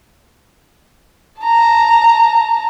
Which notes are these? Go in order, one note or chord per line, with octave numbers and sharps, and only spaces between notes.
A5 A#5